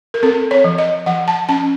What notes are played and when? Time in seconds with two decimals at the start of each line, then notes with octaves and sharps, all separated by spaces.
0.14 A#4
0.23 C4 A4
0.51 C#5
0.64 F3
0.78 D#5
1.06 F3 F#5
1.28 A5
1.49 C#4 A5